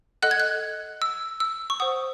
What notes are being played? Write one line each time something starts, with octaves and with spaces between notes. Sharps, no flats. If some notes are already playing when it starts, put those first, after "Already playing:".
A4 D#5 F#5 F#6
G#6
F#6
E6
E6
C#6
C5 F#5 D#6